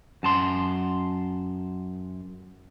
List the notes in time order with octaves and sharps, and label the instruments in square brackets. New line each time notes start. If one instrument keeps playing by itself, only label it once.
[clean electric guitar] F#2 A5 C6